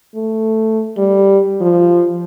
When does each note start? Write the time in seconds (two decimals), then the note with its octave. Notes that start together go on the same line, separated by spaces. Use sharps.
0.15 A3
0.98 G3
1.61 F3